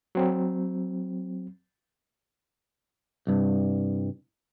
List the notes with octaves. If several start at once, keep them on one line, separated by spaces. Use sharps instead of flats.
F#3 C4
C2 G2